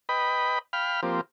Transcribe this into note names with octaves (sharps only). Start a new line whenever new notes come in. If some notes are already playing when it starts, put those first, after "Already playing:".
B4 D#5 G5 B5
F5 G5 B5 F6
F3 A#3 C4 G4